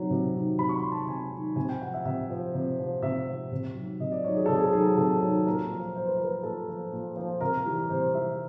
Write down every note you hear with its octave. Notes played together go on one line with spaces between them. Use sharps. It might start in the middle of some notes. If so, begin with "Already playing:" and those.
Already playing: C3 D#3 F#3
C3
D#3 F#3
C3 B5
C#6
C6
D#3 F#3
A5
C3 G#5
D#3 F#3
C3 G#5
G5
F3 F#5
E5
C3 E5
F3
C3
F3
C3 E5
F3
C3
D#3 F#3
C3 D#5
D5
D#3 F#3 C#5
G#4
C3 A4
G#4
A4
D#3 F#3 G#4
C3 A4
D#3 F#3
A#2 A#4
F3
A#2 C5
B4
F3 A#4
B4
A#2 A4
F3
A#2
F3
C3 A#4
E3 G3
C3 C5
E3 G3 E5